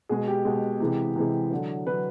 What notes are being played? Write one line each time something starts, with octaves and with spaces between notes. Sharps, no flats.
B2 G#3 G#4
G4
B2 G#3
C3 E3 G#3
C3 E3 G#3
D3 F#3
D3 F#3 B4